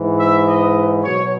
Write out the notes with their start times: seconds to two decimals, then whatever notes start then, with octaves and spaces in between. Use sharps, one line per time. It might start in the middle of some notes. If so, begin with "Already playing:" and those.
Already playing: G#2 E3
0.18 E5
0.46 D#5
1.03 B2 F#3 C#5